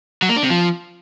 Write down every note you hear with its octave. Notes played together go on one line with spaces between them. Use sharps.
F#3
A#3
D4
C3
F3